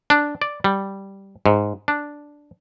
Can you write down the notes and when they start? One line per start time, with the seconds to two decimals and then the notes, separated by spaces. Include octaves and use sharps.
0.10 D4
0.42 D5
0.64 G3
1.46 G#2
1.88 D4